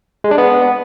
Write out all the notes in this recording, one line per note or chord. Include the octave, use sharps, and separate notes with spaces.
G#3
D4
B3